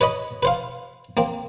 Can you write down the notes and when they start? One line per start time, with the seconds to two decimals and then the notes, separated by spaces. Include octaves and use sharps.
0.01 B4 C#5 D#5 B5
0.43 B4 C5 F5
1.17 A#3 C4